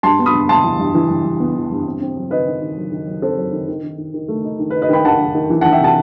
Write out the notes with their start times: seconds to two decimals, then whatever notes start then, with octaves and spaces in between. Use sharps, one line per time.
0.03 G2 A5 C6
0.19 B3
0.26 B5 D#6
0.34 G2
0.49 G2 A5 C6
0.64 E3
0.79 G2
0.94 E3
1.10 G2
1.25 G2
1.40 B3
1.55 E3
1.71 G2
1.86 C4
2.01 C4
2.16 F#3
2.31 D#3 B4 D#5
2.46 D#3
2.62 D#3
2.77 F#3
2.92 D#3
3.07 F#3
3.22 C4 A4 C5
3.37 F#3
3.53 D#3
3.68 D#3
3.83 D#3
3.98 D#3
4.14 D#3
4.28 A3
4.44 D#4
4.59 D#3
4.70 B4
4.75 D#4
4.82 B4 D#5
4.89 D#3 G5 B5
5.05 D#3 F#5 A5
5.19 D#3
5.35 D#3
5.50 E3
5.61 E3 F#5 A5
5.72 E5 G5
5.80 C3 F#5 A5